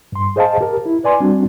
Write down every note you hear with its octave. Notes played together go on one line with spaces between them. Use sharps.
G2 C6
G#4 C5 D#5 F5 A5
G4 A#4
E4
B4 D5 G#5 C6
G3 C4 D4 F#4